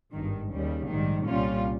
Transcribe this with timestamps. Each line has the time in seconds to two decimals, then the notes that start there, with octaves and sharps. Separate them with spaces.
0.13 G#1 G2 D#3
0.51 D#2 C#3 G3
0.88 A#1 G#2 D#3 G3
1.26 C2 A#2 G3 C#4 F4